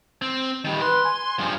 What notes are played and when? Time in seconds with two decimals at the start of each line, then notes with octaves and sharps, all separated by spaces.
0.22 C4
0.64 D#3 G3
0.82 B4 C6
1.05 G#5
1.39 G2 F3